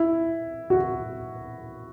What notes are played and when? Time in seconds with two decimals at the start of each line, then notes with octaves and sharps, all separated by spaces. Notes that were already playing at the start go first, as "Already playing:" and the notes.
Already playing: E4
0.70 F#4